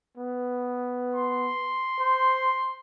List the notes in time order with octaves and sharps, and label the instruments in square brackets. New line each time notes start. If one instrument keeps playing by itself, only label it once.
[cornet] B3
[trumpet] C6
[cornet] C5